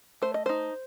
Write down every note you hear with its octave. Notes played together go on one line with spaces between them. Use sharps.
A3 C5
D#5
D#4 C5